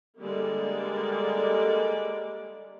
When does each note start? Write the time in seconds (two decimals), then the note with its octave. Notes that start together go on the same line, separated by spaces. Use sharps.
0.20 D3 G3 G#3 A#3 D5